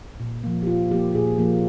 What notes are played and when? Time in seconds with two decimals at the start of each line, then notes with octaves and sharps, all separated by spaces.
0.20 A#2
0.44 F3 A#3
0.63 G4
0.67 A#2 F4
0.91 F3 A#3 G4
1.15 A#2 G#4
1.38 F3 A#3